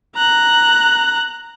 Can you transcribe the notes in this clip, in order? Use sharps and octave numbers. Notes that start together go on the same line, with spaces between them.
A#5 F#6